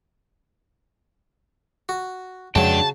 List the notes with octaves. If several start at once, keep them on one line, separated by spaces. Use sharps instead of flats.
F#4
F2 C#3 F#3 G#3 D4 G5 A5